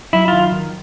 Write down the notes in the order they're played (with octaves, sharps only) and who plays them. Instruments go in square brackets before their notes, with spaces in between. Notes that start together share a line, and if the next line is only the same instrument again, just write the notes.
[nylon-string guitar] F#3 [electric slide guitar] E4
[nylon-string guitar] D#3 [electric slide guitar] F4
[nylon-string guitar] D#3